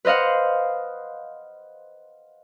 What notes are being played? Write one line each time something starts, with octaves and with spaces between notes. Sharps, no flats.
B4 C5 D#5 F5 F#5